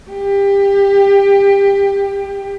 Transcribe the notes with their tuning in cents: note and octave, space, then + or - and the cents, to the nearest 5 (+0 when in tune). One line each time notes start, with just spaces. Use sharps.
G4 +20